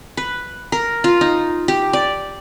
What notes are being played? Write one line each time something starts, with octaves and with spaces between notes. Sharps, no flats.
B4
A#4
F4
D#4
G4
D5